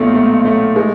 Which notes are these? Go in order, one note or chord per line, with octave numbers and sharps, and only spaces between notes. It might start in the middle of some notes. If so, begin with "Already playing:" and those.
Already playing: B1 A#2 A3 F4
A3
A3
G#3